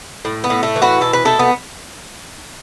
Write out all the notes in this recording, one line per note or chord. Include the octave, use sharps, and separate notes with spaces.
A2
B3
A2
A3
E3
F#4 B4
B2 A4
B4
A3 E4 A4
B3